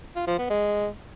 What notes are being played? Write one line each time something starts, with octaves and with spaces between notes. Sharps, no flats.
F4
F3
B3
G#3